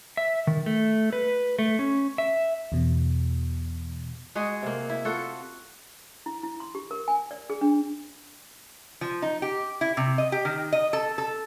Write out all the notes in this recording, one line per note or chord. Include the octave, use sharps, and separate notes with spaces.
E5
D#3
A3
B4
A3
C#4
E5
E2 B2
G#3 F#4 G#4
C3 A#3
E4
F4 F#4 A4
E4
E4
C6
G4
A#4
G#5
D5
G#4
D4
F3
D#4
G4
E4
C3
D#5
G4
D#3
D#5
A4
A4